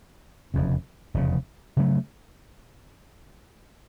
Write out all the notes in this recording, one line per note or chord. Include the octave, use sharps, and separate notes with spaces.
F1 E2 C#3
F1 E2 C#3
C#3 F#3 A3